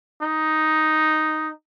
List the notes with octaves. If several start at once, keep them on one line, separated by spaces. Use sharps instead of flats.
D#4